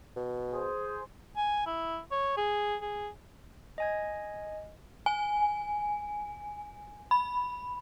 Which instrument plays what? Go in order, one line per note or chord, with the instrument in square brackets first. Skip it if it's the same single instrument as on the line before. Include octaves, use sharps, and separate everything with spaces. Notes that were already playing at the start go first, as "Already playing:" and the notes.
[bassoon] B2
[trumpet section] G#4 C5
[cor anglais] G#5
E4
C#5
G#4
G#4
[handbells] D#5 G#5 G#6
[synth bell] G#5
B5